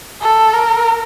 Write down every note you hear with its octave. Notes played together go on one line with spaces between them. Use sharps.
A4
A#4